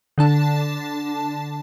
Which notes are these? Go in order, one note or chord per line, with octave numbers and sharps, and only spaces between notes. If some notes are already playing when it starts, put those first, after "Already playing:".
D3 D4 A5